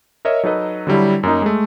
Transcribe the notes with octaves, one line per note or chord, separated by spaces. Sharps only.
A#4 C#5 D#5 E5
F#3 D#4 A4 B4 D#5
D3 F#3 G3 E4
F#2 A#3 D#4
G#3 A3